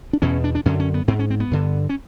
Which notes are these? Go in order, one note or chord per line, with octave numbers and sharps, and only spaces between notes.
D4
E2 B2 C#4
D4
D4
F#2 D3 C#4
C#4
B3
G#2 C4
C#4
C4
B3
G2 D3
C#4